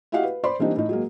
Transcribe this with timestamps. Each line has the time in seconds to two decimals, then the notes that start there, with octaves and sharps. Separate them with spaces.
0.12 E4 F#4 G4 D#5 F5 F#5
0.24 B4
0.43 C5 D5 B5 C6
0.59 E3 G3 A#3 C4 D4 D#4
0.76 A2 D#4
0.89 F#3 G#3 A#3